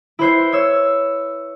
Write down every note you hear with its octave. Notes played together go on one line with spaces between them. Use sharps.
E4 B4 C5 C7
C#5 E6